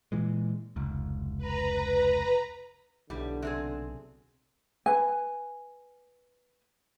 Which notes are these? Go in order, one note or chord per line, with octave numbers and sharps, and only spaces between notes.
A#2 E3 G#3
F1 C#2
B4 A#5
B1 A2 D3 G3
C3 C4 G#4
B4 G#5